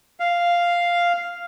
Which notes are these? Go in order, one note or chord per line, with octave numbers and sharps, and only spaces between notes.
F5